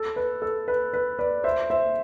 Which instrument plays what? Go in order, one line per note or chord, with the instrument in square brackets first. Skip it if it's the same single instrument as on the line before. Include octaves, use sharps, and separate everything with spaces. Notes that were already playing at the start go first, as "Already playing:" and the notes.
Already playing: [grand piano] A4
B4
A4
B4
B4
B4 D5
C5 E5
C5 E5